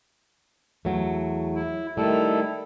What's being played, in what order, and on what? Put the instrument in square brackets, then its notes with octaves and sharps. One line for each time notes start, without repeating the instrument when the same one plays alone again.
[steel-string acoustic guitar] E2 F#3 A3
[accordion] E4
[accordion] D#3 E4 A4 [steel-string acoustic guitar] G3 A3